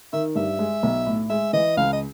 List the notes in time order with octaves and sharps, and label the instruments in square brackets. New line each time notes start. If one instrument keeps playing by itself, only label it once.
[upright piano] D#3 [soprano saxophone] E5
[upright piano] G2 [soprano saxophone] E5
[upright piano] G#3
B1
A2
[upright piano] G#3 [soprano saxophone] E5
[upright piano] E3 [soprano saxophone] D#5
[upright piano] C#2 [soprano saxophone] F5
[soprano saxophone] D#5